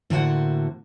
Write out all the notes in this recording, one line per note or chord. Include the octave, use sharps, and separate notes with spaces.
A2 D3 A#3 F#4 C5 F#5